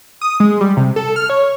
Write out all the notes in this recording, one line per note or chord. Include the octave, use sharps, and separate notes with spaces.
D#6
G#3
G3
C3
A4
F6
C#5